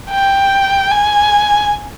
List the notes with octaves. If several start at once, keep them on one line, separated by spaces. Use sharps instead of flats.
G5
G#5